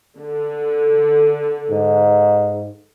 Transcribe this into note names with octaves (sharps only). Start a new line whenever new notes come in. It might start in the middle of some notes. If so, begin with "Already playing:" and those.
D3
G#2